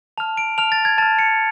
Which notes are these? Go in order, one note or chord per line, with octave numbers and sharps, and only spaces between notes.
A5 F6 F7
D7
A5 F6 F7
A6
G#6
A5 F6 A6
C#7